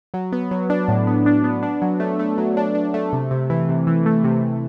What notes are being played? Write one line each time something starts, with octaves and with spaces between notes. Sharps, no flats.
F#3
B3
F#3
D4
A2
B3
D4
B3
D4
F#3
A3
A3
F#3
D4
D4
A3
C3
C3
E3
C3
E3
A3
C3
C3